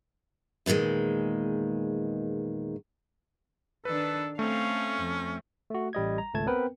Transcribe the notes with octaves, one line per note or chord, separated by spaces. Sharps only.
E2 A#2 D3 D#3 G#3
D#3 D4 A4 B4
A3 C4 C#4 F5
F2
A3 F#4
A1 G3 D#5 G#6
A#5
G#1 C#2 A3 A5 G#6
B3 C4 A#4 B4 G5